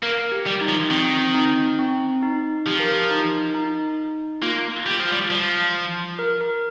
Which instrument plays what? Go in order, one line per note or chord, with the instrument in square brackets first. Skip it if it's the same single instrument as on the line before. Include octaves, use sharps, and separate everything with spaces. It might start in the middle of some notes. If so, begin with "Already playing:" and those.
[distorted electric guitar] A#3 [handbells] A#4
[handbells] G4
[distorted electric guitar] G3
[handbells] D#4
[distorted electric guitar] F3
[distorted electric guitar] D#3 [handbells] C4
[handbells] C4
D#4
C4
D#4
[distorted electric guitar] F3 [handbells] G4
[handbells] A#4
G4
D#4
D#4
[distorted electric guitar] A#3 [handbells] F4
[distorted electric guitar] G3
F3
G3
F3
[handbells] A#4
A#4